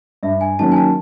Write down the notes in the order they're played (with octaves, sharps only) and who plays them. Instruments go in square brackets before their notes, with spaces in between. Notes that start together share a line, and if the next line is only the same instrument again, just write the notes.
[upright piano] G2 [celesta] E5
[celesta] G#5
[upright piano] D#3 F#3 A#3 C#4 [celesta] A5
[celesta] G#5
A5